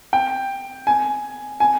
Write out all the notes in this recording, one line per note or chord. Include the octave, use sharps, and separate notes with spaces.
G5
G#5
G#5